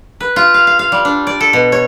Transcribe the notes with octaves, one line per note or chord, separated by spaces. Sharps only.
B4
F4
F5
F5
F5
G3
D4
D5
A4
B2
C#5